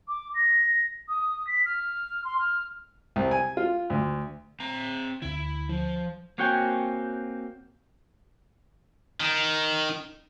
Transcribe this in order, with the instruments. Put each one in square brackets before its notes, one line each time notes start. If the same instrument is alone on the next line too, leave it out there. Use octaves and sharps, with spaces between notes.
[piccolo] D6
A#6
D#6
B6
F6
C6
F6
[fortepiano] C2
G#5
F4
D2
[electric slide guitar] C4 A#5
[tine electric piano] D2 D3 [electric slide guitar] E4
[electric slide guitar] F3
A#3 C4 F#4 C#5 G5 G#5
[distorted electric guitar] D#3